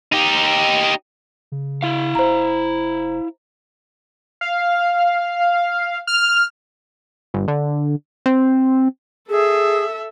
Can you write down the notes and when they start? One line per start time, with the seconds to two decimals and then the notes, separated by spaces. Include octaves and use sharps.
0.12 D#4 G4
1.52 C#3
1.83 E4 F5
2.15 F1 C5 A#5
4.41 F5
6.07 F6
7.34 G1
7.48 D3
8.26 C4
9.29 G#4 A4 E5